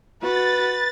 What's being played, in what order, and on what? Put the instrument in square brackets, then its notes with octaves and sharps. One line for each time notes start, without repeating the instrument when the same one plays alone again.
[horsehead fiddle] F#4 [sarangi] B4 [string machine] A6